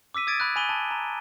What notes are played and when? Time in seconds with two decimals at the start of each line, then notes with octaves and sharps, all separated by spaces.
0.14 D6 E6 B6 D#7
0.27 D#6 G#6 A6 D7 D#7
0.40 B5 F#6
0.56 G#5 B5 D#7 G7
0.69 A5
0.91 A#5